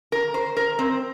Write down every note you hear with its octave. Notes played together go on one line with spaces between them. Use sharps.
A#4
C5
A#4
C4